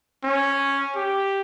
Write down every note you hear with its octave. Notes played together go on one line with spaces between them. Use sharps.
C#4
G4